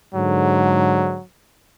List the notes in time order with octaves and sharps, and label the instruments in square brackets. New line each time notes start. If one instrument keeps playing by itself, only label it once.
[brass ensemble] G#2 D3 [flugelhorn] F#3